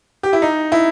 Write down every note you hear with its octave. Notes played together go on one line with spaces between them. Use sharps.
G4
E4
D#4
E4